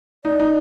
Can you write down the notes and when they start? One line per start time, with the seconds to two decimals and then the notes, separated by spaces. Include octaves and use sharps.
0.25 D#4 D5
0.40 D#4